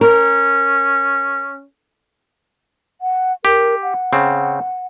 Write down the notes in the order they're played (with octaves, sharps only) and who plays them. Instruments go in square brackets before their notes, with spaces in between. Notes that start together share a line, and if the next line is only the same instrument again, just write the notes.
[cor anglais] C#4 [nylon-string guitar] A#4
[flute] F#5
[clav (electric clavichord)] G4 [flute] A#4
[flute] F#5
[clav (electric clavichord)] C#3 C4